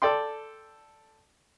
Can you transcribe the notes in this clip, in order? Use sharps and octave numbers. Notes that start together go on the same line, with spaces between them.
A4 D5 G5 C6